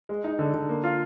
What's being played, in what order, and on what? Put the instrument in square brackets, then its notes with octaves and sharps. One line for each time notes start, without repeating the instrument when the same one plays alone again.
[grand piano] G#3
D#4
D3
D3
A#3
F4